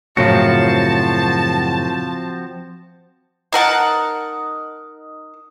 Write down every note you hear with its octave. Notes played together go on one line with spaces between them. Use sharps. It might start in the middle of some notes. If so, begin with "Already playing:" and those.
F#2 A2 C#3 F3 C4 F#4 A5
D#4 A#4 F#5 A5